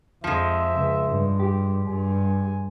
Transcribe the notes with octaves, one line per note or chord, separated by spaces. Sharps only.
F2 F3 G#3 E5
C#2
G2
G4
G2 G#5